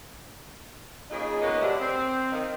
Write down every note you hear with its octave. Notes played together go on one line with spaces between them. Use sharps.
A#2 C#3 D#4 G#4
G#3 A#3 B3 C#4 D#4 D#5
D2 G2 C3 D4 E5 F#5
C4
D#3 F5